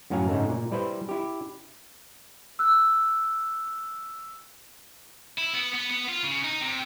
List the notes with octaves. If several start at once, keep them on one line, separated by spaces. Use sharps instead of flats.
F#2 A2 F#3 F5 G#5 A#5
G#2 C#3 G#3 A3
A#2
G3 E4 B4 C5
E4 G4
E6 F#6
E4
B3
B3
B3
F4
C#3
D#4
C3